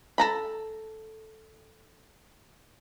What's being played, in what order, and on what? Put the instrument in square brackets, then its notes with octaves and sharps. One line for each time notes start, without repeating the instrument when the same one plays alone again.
[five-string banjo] A4 A#5 B5